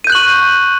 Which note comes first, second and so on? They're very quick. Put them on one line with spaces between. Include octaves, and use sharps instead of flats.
D#7 G6 F#6 F#7 C#6